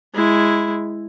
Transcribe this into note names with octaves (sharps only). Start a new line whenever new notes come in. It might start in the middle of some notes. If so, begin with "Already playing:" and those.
G#3 E4